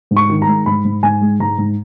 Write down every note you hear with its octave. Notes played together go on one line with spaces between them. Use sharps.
G#2
C#6
D#3
A#5
G#3
G#2 B5
G#2
G#2 G#5
G#3
G#2 A#5
G#2